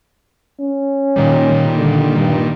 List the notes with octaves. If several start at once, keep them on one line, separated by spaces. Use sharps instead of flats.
C#4
A#2 D#3 G3
D3
G2